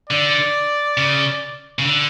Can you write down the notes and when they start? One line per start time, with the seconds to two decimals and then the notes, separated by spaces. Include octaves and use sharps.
0.10 D3 D5
0.97 C#3
1.79 C#3
1.84 D3